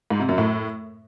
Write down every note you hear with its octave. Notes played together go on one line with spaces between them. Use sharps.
G#2
C3
F#2
A2